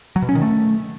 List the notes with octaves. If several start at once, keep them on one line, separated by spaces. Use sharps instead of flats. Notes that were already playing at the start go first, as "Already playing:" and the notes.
F#3
B2
C#4
D#3
A3